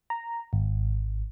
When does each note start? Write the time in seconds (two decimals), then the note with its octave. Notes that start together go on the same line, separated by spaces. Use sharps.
0.10 A#5
0.53 G#1